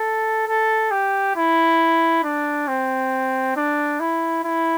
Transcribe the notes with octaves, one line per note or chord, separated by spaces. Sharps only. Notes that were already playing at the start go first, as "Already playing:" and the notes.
Already playing: A4
A4
G4
E4
D4
C4
D4
E4
E4